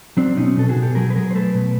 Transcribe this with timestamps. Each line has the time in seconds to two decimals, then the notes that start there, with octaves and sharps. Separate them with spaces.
0.17 F#3 C4 D4
0.37 B2 C#4 D#4
0.57 B2 A4
0.69 F#4 G#4
0.76 B2
0.82 G4 A4
0.95 F#3 G#4 A#4
1.10 B4
1.15 F#3 G#4 A#4
1.31 C5
1.35 A3 A4 B4
1.55 B2